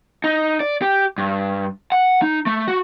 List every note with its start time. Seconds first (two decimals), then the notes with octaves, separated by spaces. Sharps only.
0.24 D#4
0.60 D5
0.82 G4
1.18 G2
1.92 F#5
2.22 D#4
2.46 A3
2.68 F#4